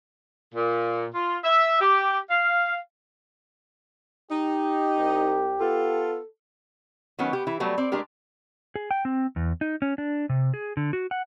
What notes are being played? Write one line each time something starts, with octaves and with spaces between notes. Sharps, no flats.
A#2
F4
E5
G4
F5
D#4 G4
C2
B3 F4 A4
D#3 F#3 B3 C#4
B3 G4
E3 E4
F#3 G3 A3 B3
C4 D5
G#3 A3 D4 G4 A#4
G#4
G5
C4
E2
D#4
C#4
D4
C3
G#4
D3
F#4
F#5